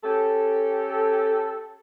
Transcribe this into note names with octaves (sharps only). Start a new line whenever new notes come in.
C#4 G4 A4